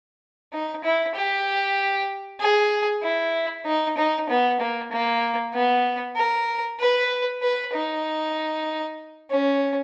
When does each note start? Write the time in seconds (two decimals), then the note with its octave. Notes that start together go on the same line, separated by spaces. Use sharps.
0.53 D#4
0.84 E4
1.15 G4
2.40 G#4
3.03 E4
3.66 D#4
3.97 D#4
4.29 B3
4.60 A#3
4.91 A#3
5.54 B3
6.17 A#4
6.80 B4
7.42 B4
7.73 D#4
9.30 C#4